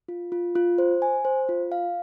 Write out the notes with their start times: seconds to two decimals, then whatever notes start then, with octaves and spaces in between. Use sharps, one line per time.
0.08 F4
0.32 F4
0.55 F4
0.78 C5
1.02 G#5
1.25 C5
1.49 F4
1.72 F5